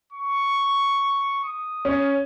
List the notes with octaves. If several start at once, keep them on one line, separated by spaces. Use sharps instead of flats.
C#6
D#6
C#4